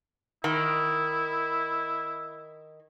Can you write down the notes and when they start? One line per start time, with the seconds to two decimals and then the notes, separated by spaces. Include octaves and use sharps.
0.44 D#3 E4